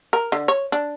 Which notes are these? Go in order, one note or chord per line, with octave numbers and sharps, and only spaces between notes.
A#4
D3
C#5
D4